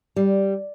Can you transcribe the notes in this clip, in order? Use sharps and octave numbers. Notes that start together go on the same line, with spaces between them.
G3